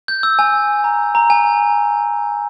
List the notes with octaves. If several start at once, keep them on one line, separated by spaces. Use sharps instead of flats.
G6
E6
G#5
A#5
A#5
G#5